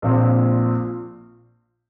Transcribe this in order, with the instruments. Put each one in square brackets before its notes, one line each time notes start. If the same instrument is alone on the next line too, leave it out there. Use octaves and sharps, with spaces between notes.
[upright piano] A#1 A#2 F3 C4